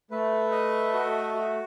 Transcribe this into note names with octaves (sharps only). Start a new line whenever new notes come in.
A3 B4
D#5
F#4
F#4